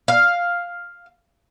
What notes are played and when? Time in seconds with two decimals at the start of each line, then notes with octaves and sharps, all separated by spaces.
0.08 F5